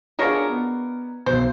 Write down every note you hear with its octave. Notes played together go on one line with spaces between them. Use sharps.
B2 D4 F4 G#4 A#4 C#5
B3
B1 B2 C5